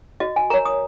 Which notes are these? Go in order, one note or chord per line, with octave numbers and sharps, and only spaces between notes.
F#4 D#5
G#5
A#4 C#5 A#5
D#6